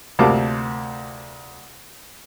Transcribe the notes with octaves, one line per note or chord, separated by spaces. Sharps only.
D2 C3 A#3 F4 A5 D6